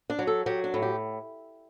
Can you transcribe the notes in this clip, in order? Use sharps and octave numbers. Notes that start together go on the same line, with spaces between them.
D4
F#3
A4
F#3 G4
D4
A2
G4